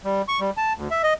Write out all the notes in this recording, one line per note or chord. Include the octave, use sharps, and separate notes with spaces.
G3
C#6
G3
A5
D2
E5
D#5